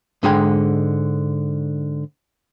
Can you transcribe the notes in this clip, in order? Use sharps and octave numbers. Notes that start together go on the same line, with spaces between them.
G#2 D3 G#3 G#4 G5